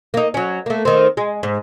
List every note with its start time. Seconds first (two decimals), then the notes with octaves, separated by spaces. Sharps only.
0.14 A#3 D#4
0.34 F#3 C#4
0.66 A3 A#3
0.85 D#3 C4
1.17 G#3
1.43 G#2